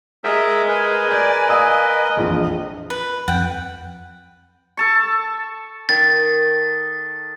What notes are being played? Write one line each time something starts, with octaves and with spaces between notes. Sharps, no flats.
G#3 G#4 A#4 E5
A#4 B4 G#5
D5 G6
D#5 F5 D#6 E6
E1 A#1 F2
B4
F2 F#5 G5
A4 A5 C#6
D#3 A6